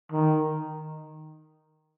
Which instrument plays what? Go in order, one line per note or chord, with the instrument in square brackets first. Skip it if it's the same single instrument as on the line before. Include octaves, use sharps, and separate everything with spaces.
[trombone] D#3